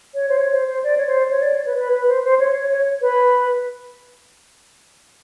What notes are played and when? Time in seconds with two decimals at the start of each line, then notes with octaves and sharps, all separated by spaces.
0.14 C#5
0.29 C5
0.37 C#5
0.53 C5
0.68 C5
0.84 D5
0.97 C#5
1.07 C5
1.31 C#5
1.42 D5
1.54 C#5
1.66 B4
1.78 B4
1.93 B4
2.08 C5
2.24 C5
2.40 C#5
2.55 C#5
2.71 C#5
3.01 B4